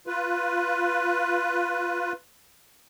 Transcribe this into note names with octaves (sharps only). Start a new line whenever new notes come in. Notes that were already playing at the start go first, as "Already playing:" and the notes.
F4 B4